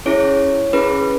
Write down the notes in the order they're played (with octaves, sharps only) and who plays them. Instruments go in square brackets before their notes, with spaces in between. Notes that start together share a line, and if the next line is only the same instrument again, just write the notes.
[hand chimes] C#4 E4 G#4 C#5
C#4 E4 G#4 B4